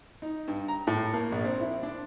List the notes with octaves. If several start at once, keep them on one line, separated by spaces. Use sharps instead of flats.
D#4
G2
A#5
A2
A#3
A#1
C4
E4
D4